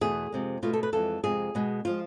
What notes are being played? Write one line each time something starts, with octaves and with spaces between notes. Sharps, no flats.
E2 B2 A3 G#4
F2 C3 G#3
B2 A3 F4
A4
B4
F2 E3 G#3 A4
F2 C3 G#3 G#4
B2 G#3
F3 G#3 F4